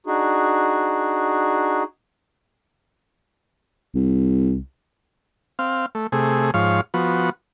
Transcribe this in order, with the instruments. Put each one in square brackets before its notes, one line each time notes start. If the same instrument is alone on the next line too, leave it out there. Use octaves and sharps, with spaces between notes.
[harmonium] D4 D#4 F#4 G#4
[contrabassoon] C2
[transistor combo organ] C4 F5
A3
C3 A3 G#4
G#2 F3 C#5 F5
F3 B3 F#4